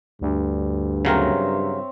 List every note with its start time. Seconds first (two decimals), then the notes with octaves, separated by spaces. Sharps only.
0.22 D2 G2
1.05 C#3 F#3 C4 A#4 C#5 E5